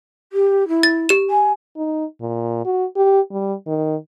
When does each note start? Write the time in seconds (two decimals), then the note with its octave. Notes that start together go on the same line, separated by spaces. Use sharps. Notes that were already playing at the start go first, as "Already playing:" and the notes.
0.32 G4
0.68 E4
0.83 A6
1.09 G4 E7
1.30 G#5
1.76 D#4
2.21 A#2
2.65 F#4
2.96 G4
3.31 G3
3.67 D#3